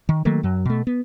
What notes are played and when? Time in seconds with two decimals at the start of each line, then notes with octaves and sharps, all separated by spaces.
0.09 D#3
0.25 D#3 F#3 A3 A#3
0.43 F#2 F#3
0.65 B2 A3
0.87 B3